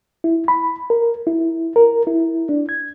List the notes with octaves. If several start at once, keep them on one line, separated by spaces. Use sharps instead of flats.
E4
B5
A#4
E4
A#4
E4
D4
G#6